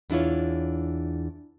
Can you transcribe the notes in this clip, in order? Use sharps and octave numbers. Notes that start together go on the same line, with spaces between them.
E2 D4 E4 F4 C#5